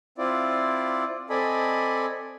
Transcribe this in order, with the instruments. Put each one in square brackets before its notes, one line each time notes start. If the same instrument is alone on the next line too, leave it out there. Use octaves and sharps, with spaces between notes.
[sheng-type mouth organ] C4 E4 F4 D5
C4 A4 D5 D#5 G#5 B5